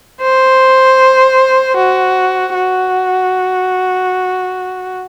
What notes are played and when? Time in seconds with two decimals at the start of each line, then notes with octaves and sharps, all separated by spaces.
0.22 C5
1.77 F#4
2.54 F#4